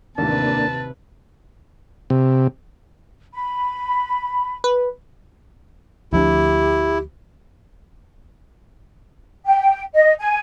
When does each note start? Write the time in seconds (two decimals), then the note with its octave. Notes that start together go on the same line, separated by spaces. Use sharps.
0.18 A1 D#2 C3 A#3 D4 B4 A5
2.10 C3
3.33 B5
4.64 B4
6.13 D2 F3 D4 E4 G4
9.46 G5
9.95 D#5
10.19 G#5